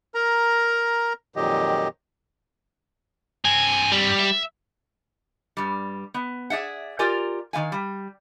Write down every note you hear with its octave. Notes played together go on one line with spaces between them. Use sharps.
A#4 A#5
F2 A#2 D#3 F#3 G4 D#5
G2 C4 G#5
G3
E5
G2 G3
B3
G#4 D5 E5 F#5
F4 G4 A#4 D5 G#5
D#3 G#3 F5 G#5
G3